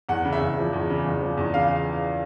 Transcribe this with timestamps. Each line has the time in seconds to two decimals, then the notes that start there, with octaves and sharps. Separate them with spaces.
0.09 E2 F#5
0.25 C#3
0.33 E5
0.41 E2
0.58 F3
0.73 E2
0.90 C#3
1.05 E2
1.21 F3
1.37 E2
1.54 C#3 F5